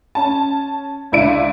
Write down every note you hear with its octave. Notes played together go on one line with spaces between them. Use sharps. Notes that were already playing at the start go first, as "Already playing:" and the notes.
C#4 A5
C#2 D3 E4 D5 D7 D#7